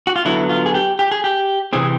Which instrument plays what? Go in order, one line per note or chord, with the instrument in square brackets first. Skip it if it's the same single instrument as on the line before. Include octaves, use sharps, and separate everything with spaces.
[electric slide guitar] F#4
F4
D3 F#3 B3 E4
F4
G#4
G4
G4
G#4
G4
C3 E3 C4 G#4